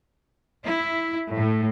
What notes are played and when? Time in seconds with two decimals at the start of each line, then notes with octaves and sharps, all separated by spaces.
0.66 E4
1.34 A2